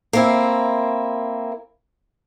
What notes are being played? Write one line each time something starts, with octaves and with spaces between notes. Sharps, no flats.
A#3 C4 E4